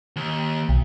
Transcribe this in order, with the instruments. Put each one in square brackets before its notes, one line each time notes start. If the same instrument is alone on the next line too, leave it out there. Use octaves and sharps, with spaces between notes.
[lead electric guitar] D#2
[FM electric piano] B1